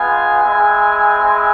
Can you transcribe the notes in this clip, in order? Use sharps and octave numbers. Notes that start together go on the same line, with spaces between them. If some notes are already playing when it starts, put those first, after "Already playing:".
Already playing: G#3 B3 F4 G#5
G#3 C4 E4
G#3 C4 E4